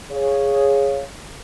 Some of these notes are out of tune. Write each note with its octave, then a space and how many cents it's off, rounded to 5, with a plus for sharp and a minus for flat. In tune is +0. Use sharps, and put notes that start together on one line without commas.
G#4 +0 C#5 +0 F5 +0